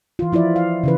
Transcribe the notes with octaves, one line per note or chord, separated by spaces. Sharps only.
E3 F4
F3 E4 F4 D5
F5
C#3 E3 B4